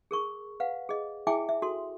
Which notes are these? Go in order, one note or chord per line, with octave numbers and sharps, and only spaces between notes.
G#4 A#4 C#6
B4 F5 F#5
G#4 D#5
E4 G#4 E5 G5 G#5 D6
E5
F#4 A4 C6